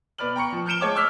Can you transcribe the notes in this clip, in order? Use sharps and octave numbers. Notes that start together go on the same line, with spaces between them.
B2 B4 D5 F6 F#7
G5 A#5 C#6 C#7
F3
F6 G6 C#7 D7 E7 G7
G#3 C#5 A5 D6
D6 E6 F6 B6